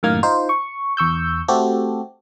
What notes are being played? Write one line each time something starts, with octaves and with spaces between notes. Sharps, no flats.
F#2 A2 D#3 A#3 F6 G#6
D#4 F4 C5
C#6
E2 C#6 E6 G6
A3 C4 F#4 G4 A4